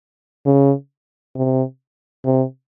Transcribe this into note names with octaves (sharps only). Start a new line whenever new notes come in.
C#3
C3
C3